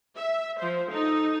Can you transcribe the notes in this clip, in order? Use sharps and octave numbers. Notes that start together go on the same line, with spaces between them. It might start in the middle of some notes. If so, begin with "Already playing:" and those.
E5
F3 C5
D#4 A4